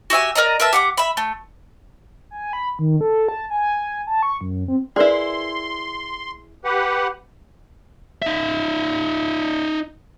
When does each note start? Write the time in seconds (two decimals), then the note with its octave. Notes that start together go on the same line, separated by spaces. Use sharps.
0.10 F#4 G4 E5 G#5
0.35 A#4 D5 D#5 A#5
0.60 A#4 B4 E5 A5
0.73 G4 F#5 D6
0.97 E5 B5
1.17 A3
2.31 G#5
2.53 B5
2.79 D#3
3.01 A4
3.29 A5
3.50 G#5
4.07 A5
4.23 C#6
4.41 F#2
4.68 C4
4.96 E4 G#4 A#4 B4 D5 C6
6.65 G4 B4 F#5
8.22 D#4 E5